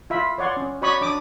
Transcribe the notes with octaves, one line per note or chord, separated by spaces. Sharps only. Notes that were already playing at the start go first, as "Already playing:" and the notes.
F4 E5 B5
C#5 D5 F#5 C6
C#4
F#4 C#5 D5 B5 C#6 D#6
D4 D5 D6 D#6